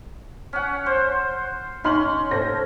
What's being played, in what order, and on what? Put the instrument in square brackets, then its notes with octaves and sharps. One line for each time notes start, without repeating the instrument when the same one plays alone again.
[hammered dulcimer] C#4 F#5
C5
[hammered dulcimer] C#4 [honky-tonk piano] D#4 C6 F#7
[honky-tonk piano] A4 C5 A#6